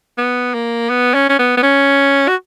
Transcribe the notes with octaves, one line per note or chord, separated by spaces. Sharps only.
B3
A#3
B3
C#4
C#4
B3
B3
C#4
F#4